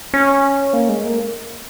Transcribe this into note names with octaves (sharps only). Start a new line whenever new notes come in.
C#4
A#3
G#3
A#3